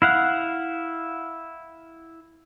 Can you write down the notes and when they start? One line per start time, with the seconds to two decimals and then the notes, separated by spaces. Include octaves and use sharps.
0.02 E4 F5 F#5